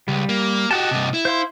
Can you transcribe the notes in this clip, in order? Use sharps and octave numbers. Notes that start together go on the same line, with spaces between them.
C#2 G3
A#3
F#4 G4 D#5 F#5 A5
G2 C3
E4
C5 F5 C6